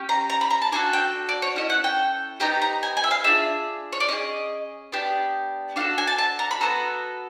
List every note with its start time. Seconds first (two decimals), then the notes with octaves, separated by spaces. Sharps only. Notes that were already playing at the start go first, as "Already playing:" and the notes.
Already playing: C#4 G4
0.09 A#5
0.30 A#5
0.41 B5
0.50 A#5
0.62 A5
0.72 D4 F#4 A4 G#5
0.93 G5
1.29 D5
1.42 C#5
1.56 C#4 E4 A4 D#5
1.70 F#5
1.84 G5
2.40 B3 D#4 G4 A#5
2.62 A#5
2.83 G#5
2.97 G#5
3.04 E5
3.11 F5
3.24 D4 F4 G#4 E5
3.93 C#5
4.00 D5
4.08 C#4 E4 G#4 D#5
4.92 B3 D4 G4
5.76 D4 F#4 A4 F5
5.98 G#5
6.07 A5
6.18 A5
6.39 A#5
6.51 B5
6.61 B3 D#4 F#4 A4 A#5